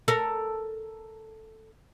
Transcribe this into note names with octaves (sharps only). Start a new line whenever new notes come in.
A4 A#4